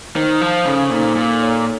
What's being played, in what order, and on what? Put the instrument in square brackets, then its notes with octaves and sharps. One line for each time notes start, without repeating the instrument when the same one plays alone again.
[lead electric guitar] D#3 [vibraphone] C5
[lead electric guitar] F3 [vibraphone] F5
[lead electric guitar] C#3 [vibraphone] A4
[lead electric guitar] A#2 [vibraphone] D#4
[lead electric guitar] A#2 [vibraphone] A4
[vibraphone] C#5